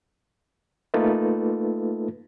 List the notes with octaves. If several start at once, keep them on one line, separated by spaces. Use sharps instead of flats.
A3 A#3 D#4 F4 A4 B4